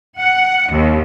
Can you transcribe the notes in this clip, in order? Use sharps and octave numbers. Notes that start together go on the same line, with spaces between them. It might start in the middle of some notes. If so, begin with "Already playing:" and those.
F#5
D#2